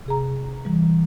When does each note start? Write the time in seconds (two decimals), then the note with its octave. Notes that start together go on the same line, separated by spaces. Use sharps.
0.06 C3 G#4 A#5
0.65 E3 G3